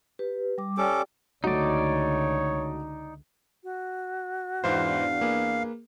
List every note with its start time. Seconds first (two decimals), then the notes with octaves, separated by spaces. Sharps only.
0.19 G4 B4
0.58 G3 D6
0.77 C#4 G4 A4 D5 G5 D6
1.44 C#2 D3 A3 D#4 F#4 C#5 D5
3.64 F#4
4.64 E2 G#2 E3 D4 C5 F5
5.21 A#3 G#4 B4